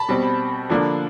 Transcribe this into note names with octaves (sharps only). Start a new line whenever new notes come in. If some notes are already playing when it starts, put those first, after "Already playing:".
Already playing: A5 B5
B2 G3 C4
D3 F3 A#3 D4